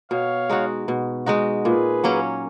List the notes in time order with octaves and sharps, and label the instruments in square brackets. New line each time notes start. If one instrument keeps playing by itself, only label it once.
[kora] B2 [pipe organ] C#5 F5
[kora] G#3 D#4 F#4
B2
G#3 D#4 F#4
[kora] A#2 [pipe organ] G#4 B4
[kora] F#3 A#3 C#4